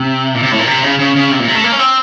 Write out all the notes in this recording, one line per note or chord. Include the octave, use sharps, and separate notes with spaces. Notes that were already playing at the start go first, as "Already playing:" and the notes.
Already playing: C3
A#2
C3
A2
A#2
C3
C#3
C#3
C#3
C3
A#2
C3
A3
A#3
C#4
C4